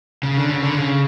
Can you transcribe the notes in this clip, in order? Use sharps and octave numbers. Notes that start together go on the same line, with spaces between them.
C#3
D3
C#3
D3
C#3